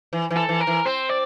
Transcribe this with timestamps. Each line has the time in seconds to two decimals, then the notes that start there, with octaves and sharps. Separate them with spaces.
0.13 E3
0.31 E3
0.37 A4
0.49 E3
0.61 A#4
0.67 E3
0.85 C4 C5
1.09 D5